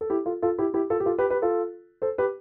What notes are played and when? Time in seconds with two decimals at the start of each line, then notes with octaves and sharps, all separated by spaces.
0.01 A4
0.10 E4 G4
0.26 F4 A4
0.42 F4 A4
0.58 E4 G4
0.74 E4 G4
0.90 F4 A4
1.00 G4
1.05 F4 A4
1.18 G4 B4
1.30 G4 B4
1.42 F4 A4
2.02 A4 C5
2.18 G4 B4